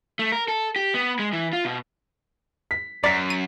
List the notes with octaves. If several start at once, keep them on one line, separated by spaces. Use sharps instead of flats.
A3
A#4
A4
G4
B3
G#3
E3
F4
B2
B6
F#2 D5 A#5 B6
D#7